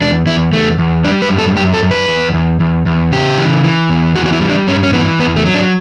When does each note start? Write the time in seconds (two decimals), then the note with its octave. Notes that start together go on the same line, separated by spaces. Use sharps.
0.01 E2 D4
0.26 E2 E4
0.53 E2 A3
0.79 E2
1.04 G3 D4
1.22 B4
1.30 F#2
1.39 A4
1.56 F#2 G4
1.74 A4
1.83 F#2
1.91 B4
2.08 E2
2.34 E2
2.60 E2
2.86 E2
3.12 C#3 G4
3.38 E3
3.64 E3
3.90 E2
4.16 E3 F#4
4.26 F#4
4.33 E4
4.41 G3
4.50 D4
4.67 G2 C#4
4.83 C#4
4.93 E3 B3
5.20 E2 B3
5.36 A3
5.45 F#3
5.54 D4